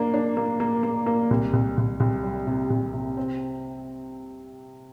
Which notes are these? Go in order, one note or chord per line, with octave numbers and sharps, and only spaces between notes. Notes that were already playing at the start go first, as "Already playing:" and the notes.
Already playing: A#3 D4
D4
A#3
A#3
A#3
A#3
C2
C2
C2
C2
G3
C3
C2
C3
C4